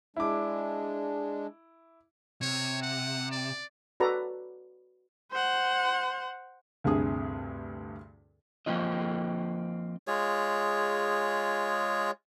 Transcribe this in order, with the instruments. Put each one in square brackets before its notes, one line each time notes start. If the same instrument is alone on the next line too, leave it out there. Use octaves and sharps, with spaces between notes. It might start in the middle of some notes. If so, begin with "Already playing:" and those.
[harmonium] G#3 D4 [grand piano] E4 D6
[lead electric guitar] C3 [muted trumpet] C#5
[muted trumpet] F#5
D5
[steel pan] F#4 A4 B4 D5 A#5
[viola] C5 F#5
[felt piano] D2 G2 C3 G#4 D#6
[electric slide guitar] F3 A#3 C4 F4 D#5
[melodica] G#3 F4 G#4 C#5